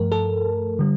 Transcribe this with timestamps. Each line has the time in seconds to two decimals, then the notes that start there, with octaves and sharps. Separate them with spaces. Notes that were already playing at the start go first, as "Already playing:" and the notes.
Already playing: G2 F3 A3 A#4
0.12 A4
0.79 D3 G3